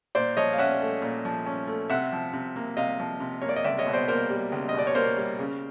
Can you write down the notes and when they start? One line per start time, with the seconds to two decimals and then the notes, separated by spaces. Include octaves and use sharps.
0.15 A#2 C5 D5
0.37 F3 C#5 D#5
0.53 F5
0.58 C#4 E5 F#5
0.81 A3
1.02 A#2
1.25 F3
1.46 C#4
1.67 A3
1.90 C3 E5 F#5
2.12 F3
2.33 C3
2.56 A#3
2.77 C3 D#5 F5
3.00 F3
3.20 C3
3.42 A#3 C#5
3.49 D5
3.56 D#5
3.64 C#2 D5 E5
3.79 C#5 D#5
3.86 B2
3.93 C5 D5
4.08 A#3 A#4 C5
4.29 G3
4.52 C#2
4.69 D#5
4.74 B2 D5
4.87 C#5
4.95 A#3 A#4 C5
5.17 G3
5.39 C#3